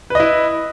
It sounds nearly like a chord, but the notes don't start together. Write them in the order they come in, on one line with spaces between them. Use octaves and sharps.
B4 D#5 E4